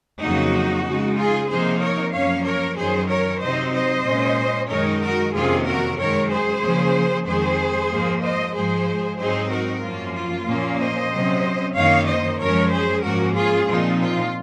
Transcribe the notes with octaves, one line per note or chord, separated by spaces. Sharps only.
F2 C#3 F#3 A#3 D#4 F#4
C#3 G#3 D#4
F4 G#4
C3 F3 A#3 D#4 G#4 C5
A#4 C#5
F#2 F3 A#3 C#4 C#5 F5
A#4 C#5
F#2 D#3 F#3 C#4 G#4 C5
A#4 C#5
C3 F#3 C4 D#4 C5 D#5
C5 D#5
A#2 G#3 C#4
F#2 D#3 G#3 D#4 A#4 C#5
F#4 A#4
F2 C3 D#3 A#3 C#4 F4 G#4
F#4 A#4
F#2 D#3 G#3 A#4 C#5
G#4 C5
C#3 F3 A#3
F2 D#3 G#3 G#4 C5
G#2 F3 A#3
C5 D#5
G#2 F3 G#3 G#4 C5
G#2 F#3 C4 D#4 G#4 C5
F#4 A#4
F#2 F3 A#3 C#4 F4
F4
A#2 F3 A#3 C#4
C5 D#5
C3 F#3 C#4
F#2 D#3 A#3 D#4 C#5 F5
C5 D#5
F#2 F3 G#3 C#4 A#4 C#5
G#4 C5
G#2 F3 A#3 C#4 F#4 A#4
F4 G#4
A#2 F3 C4 D#4 F4
F4